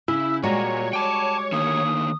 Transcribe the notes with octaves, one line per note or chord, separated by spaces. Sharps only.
C#3 E4 E6
A#2 G3 G#3 F#4 C#5 A#5
G5 A5 D6
D3 D#3 A#3 D#6